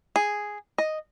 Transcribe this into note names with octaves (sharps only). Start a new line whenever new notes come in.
G#4
D#5